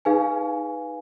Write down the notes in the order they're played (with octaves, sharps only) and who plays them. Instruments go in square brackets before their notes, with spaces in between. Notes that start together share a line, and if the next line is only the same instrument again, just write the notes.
[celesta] D#4 G#4 B4 F5 G#5